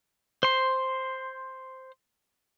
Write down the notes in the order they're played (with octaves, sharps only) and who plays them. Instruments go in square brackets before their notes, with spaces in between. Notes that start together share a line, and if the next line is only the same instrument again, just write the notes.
[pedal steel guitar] C5 C6